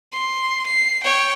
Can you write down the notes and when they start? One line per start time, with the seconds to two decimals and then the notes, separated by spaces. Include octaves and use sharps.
0.13 C6
0.66 C7
1.03 C#5 G5